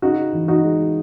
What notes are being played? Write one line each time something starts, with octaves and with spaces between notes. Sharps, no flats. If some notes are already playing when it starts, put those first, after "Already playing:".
C#3 D#4 F#4
E3
D#4 F#4
G#3